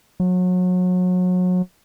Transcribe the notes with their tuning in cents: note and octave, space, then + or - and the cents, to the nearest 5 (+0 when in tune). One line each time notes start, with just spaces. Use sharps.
F#3 -30